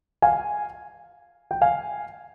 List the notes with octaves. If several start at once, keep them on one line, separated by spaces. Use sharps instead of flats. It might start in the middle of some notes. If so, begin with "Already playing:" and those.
F5 G#5
G5
F5 G#5